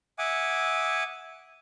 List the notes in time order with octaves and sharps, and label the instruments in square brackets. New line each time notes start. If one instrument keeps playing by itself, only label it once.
[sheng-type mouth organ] E5 F#5 G#5 D6 D#6